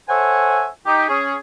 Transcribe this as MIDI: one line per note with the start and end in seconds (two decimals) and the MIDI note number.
0.09 0.67 69
0.09 0.67 72
0.09 0.67 73
0.09 0.67 76
0.09 0.67 78
0.09 0.67 80
0.86 1.08 63
0.86 1.08 67
1.09 1.36 61
1.09 1.36 68